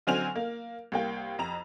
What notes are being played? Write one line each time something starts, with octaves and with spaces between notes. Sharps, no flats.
D3 F#3 C4 G#5 F6 F7
A#3
C2 A#3 G5
F2 A#5 F7